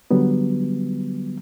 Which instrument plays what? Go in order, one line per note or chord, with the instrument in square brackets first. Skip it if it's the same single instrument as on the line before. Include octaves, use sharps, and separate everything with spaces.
[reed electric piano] D3 F#3 G3 B3